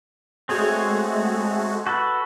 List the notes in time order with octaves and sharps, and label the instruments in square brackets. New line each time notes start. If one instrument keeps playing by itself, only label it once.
[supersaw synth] G#3 A3 F#4 [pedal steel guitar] C4 G#4 C#5
[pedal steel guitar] F#4 A4 B4